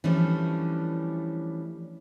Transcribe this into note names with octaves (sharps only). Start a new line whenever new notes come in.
E3 F3 G3 A3 C#4 D4